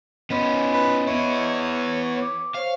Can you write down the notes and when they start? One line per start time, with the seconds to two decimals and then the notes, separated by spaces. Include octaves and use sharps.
0.30 B3 C#4 D#5 B5 C6
0.73 B4
1.07 B3 E4 C#5
2.22 D6
2.55 C5 C#5 F5 C#6